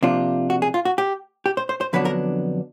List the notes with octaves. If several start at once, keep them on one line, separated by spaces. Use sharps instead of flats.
C3 F3 A#3 D4 F4
F#4
G#4
F4
F#4
G4
G4
C5
C5
C5
F2 D3 F#3 B3 D4 B4
A#4